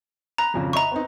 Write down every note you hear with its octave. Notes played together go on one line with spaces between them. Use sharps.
A#5 B5 F#6 A#6
G#1 F2 C#3
D#5 E5 A#5 B5 C#6
B3 C4 D#4